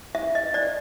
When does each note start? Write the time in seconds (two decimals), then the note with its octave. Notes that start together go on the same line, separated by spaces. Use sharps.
0.15 E5
0.35 D#5
0.54 D5